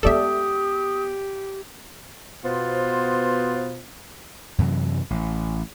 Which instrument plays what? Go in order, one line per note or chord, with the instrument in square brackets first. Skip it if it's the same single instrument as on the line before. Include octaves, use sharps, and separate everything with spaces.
[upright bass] G#3 B3 [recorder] G4 [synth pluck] A4 D5 E5 [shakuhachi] D#6
[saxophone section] B2 B3 F4 C5
[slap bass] F#2 C3 E3 F#3
A1